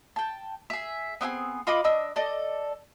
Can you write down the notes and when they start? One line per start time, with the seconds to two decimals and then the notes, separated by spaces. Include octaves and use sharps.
0.16 G5 A5
0.70 G#4 E5
1.21 B3 C4 E4 G#4
1.67 F4 D#5 B5 D6
1.84 D4 D#5 E6
2.16 A4 D5 D#5